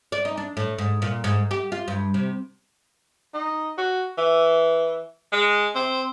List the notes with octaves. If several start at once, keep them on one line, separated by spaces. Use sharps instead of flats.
D5
D#4
D4
A2
G#2
A#2
G#2
G4
F4
G2
C3
D#4
F#4
E3
G#3
C4